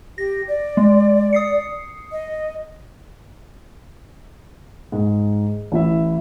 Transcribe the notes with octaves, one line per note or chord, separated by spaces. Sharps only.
G4 A#6
D5
G#3
D#6 C7 C#7
D#5
G#2
A1 E4 E5